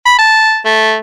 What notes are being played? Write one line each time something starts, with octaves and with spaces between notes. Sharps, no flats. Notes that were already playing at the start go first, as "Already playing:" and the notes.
B5
A5
A3